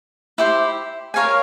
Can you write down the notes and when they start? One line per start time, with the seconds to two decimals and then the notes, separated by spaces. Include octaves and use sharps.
0.38 E4 G4 C5
1.14 A#4 C#5 F5 G#5